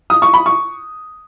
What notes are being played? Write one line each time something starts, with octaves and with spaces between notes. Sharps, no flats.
D#6
C#6
B5
C#6